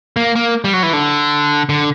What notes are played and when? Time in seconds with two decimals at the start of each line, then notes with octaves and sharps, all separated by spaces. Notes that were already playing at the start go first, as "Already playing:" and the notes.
0.16 A#3
0.35 A#3
0.64 G3
0.73 F#3
0.83 E3
0.93 D3
1.69 D3